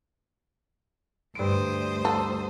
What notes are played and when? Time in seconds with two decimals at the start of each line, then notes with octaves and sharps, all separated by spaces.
1.35 D2 G2 C5 D#6 D7
2.05 A4